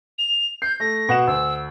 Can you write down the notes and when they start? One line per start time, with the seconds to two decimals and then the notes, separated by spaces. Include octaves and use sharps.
0.18 F7
0.62 G6 C7
0.80 A3 A#6
1.09 B2 F#5 E7
1.27 D2 E6